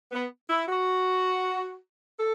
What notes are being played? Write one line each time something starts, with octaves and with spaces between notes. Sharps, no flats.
B3
E4
F#4
A4